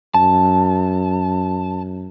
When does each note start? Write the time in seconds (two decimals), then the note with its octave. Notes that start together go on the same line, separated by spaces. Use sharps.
0.14 F#2 A5